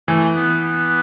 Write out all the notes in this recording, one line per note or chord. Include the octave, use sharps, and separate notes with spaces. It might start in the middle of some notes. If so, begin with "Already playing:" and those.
E3 A3
B3
B3